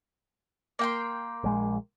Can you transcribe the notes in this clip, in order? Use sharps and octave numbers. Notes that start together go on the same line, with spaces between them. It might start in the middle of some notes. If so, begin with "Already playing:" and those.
A#3 G5 C6
A#1 G#3